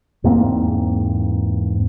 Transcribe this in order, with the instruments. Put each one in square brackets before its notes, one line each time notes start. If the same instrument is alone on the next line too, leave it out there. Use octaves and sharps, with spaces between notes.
[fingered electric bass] E2 G#2 A#3 C4